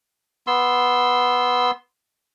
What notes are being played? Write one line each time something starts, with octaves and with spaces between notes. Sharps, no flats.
B3 C6 E6